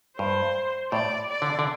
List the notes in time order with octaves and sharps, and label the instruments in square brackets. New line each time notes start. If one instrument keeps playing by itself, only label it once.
[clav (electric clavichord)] G2 [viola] C5
[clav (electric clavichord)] A2 [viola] D5
[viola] D5
[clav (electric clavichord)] D3
D3